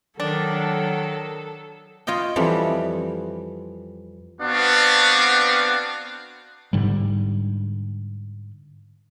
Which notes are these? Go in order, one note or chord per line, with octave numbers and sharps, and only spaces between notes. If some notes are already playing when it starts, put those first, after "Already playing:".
D#3 F#3 D4 A4
F4 C#5 D#5 G5
F2 E3 G3
B3 C4 D4 F#4 B4 F5
G#2 D3 G3